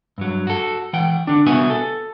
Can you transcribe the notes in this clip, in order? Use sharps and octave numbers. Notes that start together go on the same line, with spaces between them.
G2 F#3
F#4 A4
E3 F#5 G5
D3 D4
C2 B2 B3 E4 F#4 G#5
A4